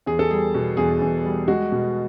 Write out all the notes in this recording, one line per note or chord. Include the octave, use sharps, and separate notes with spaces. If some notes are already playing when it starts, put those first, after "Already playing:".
E2 G#4
A4
G3 G#4
B2
E2 G#4
E2
G3
G#3 F#4
B2